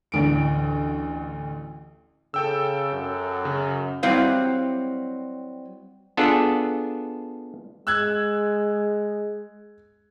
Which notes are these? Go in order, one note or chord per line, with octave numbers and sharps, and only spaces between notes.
A1 D2 D7
C#3 A4 G5 E6
F#2
C#3
F#3 G3 C4 E4 F5
B3 D4 F4 G#4 A4
G#3 E6 F#6 G#6